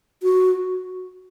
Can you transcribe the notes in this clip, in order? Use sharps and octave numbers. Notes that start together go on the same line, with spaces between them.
F#4